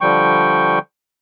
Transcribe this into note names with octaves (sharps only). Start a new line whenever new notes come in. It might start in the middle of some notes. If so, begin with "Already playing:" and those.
D3 F3 G3 G5 C#6